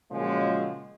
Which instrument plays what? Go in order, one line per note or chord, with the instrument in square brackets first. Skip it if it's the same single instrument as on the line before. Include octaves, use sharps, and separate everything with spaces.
[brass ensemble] A#2 C#3 F3 F#3 G#3